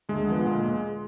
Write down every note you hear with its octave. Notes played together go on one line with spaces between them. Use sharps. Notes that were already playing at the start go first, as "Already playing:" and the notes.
D2 G#3
D3 F3 B3
A#2